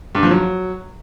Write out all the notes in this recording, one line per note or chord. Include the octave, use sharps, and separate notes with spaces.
G2
F3
F#3